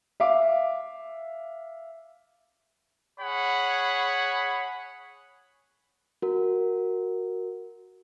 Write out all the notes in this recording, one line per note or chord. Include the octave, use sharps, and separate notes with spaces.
E5 F5 D6
G#4 C#5 F#5 B5
F#4 A#4